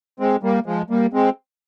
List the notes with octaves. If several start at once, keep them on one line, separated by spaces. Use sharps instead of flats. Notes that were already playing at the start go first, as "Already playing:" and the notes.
G#3 C4
G3 A#3
F3 G#3
G3 A#3
G#3 C4